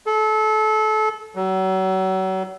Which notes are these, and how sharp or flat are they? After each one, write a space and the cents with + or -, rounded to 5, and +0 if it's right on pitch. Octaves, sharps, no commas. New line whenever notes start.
A4 -30
F#3 +35